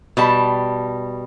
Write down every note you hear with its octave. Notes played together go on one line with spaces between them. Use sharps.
B2 G3 A5